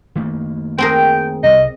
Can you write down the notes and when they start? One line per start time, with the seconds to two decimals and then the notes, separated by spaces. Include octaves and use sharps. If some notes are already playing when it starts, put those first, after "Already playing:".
0.16 D#3 A3 A#3
0.78 C4 G#4 A#4 G5
1.43 C2 G3 D#5